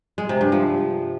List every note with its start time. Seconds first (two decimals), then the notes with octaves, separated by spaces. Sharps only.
0.18 G#3
0.29 C3
0.41 G2
0.52 F3